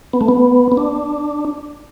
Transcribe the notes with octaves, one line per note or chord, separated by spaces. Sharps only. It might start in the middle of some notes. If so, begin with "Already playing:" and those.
B3
A3
B3
B3
D4